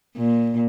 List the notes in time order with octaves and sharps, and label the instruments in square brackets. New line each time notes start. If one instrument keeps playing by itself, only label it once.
[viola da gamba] A#2